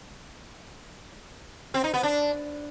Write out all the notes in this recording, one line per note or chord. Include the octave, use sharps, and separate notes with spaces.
C4
D#4
B3
D4